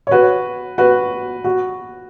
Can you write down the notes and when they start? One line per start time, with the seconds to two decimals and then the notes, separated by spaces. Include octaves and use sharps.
0.07 C#5
0.11 F#4 B4
0.78 F#4 B4
1.44 F#4